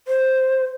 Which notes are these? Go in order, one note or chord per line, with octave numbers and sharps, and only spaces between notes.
C5